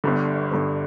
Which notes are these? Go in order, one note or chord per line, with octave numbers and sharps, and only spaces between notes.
G1 G2 D3
G1 G2 D3